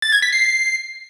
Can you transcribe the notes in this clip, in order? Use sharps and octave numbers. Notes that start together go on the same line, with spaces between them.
A6
G#6
B6
C7